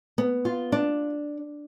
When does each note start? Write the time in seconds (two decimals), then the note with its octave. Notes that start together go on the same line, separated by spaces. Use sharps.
0.18 B3
0.45 F4
0.72 D4